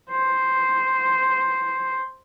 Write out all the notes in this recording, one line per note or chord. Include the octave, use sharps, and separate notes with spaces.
C5